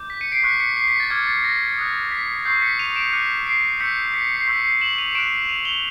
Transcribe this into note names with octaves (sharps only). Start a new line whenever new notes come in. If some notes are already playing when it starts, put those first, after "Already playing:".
Already playing: D6 G6
B6
C#7 D#7
C7 D7
C#6 F#6 B6 C#7
B6 C#7
C7
B6 C#7
A6
D6 F6 G#6
A6
A#6
D#6 F#6
B6
C#6 E6 G6 C7
B6 C#7
D#7 F7
D7 E7
D6 F#6 C#7 D#7
C7 D7
C#6 E6 G6 B6 C#7
B6 C#7
B6 C#7
C7
C#6 E6 G6 B6
C7
E7 F#7
D#7 F7
C#6 F#6 D7 E7
D#7 F7
F7 G7